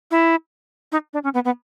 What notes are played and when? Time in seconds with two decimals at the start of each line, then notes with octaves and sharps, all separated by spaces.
0.11 E4
0.92 D#4
1.14 D4
1.24 C#4
1.34 B3
1.45 B3